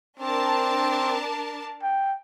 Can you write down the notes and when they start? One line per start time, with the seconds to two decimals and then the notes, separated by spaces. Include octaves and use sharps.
0.20 C4 D4 A#4 A5
1.83 G5